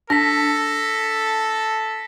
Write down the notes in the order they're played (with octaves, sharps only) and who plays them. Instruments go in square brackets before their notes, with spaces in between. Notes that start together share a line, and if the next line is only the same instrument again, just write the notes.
[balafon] D4 [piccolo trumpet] A4 [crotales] A#6 B6